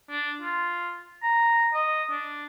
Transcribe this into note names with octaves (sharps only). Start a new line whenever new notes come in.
D4
F4
A#5
D#5
D4